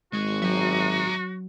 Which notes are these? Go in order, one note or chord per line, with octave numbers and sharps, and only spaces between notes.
G#1 G#3 F#4
F#3 E5 A#5